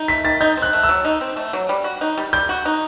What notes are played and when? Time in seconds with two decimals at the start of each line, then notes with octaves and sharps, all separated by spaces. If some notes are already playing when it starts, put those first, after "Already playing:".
Already playing: D#4
0.08 A3 B6
0.25 D#3 A6
0.41 D#4 G6
0.57 C4
0.62 F#6
0.73 A3
0.83 E6
0.89 F#3
1.05 D#4
1.21 C4
1.36 A3
1.53 F#3
1.69 G3
1.84 F#4
2.01 D#4
2.18 G3
2.33 G3 G6
2.49 F#4
2.65 D#4